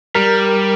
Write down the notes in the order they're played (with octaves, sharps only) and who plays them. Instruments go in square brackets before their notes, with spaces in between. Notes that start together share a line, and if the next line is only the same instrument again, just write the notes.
[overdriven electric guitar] G3 [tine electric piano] A#4